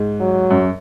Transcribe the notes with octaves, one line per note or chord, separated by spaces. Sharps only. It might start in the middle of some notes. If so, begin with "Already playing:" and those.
Already playing: G#2
F#3
F#2